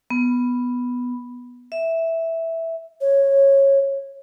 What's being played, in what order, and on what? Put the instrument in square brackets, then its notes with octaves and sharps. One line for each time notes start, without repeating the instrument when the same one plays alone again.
[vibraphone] B3
E5
[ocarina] C#5